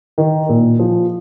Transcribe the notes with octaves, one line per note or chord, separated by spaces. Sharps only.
D#3
A#2
F3